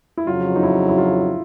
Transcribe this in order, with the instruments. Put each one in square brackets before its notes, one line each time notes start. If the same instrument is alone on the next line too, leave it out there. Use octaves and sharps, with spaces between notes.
[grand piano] E4
[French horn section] F2 C#3 F#3 [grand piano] F4
[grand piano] D#4
E4
E4
F4